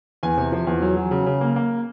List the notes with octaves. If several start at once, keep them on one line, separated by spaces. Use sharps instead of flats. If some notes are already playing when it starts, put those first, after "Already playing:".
E2 G#5
C3
F3
E2
F#3
F#3
C#3
C#3
A#3
A#3